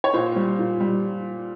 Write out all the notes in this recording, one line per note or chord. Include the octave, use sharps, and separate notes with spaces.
C#5
A#2 C5
G3
A#2
G3